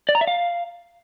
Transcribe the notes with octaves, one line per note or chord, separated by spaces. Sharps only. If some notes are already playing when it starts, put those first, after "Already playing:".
D5
A#5
E5
F5